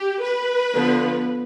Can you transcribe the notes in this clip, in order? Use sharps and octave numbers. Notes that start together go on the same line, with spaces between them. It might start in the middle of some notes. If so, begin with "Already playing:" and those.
Already playing: G4
B4
D3 F3 B3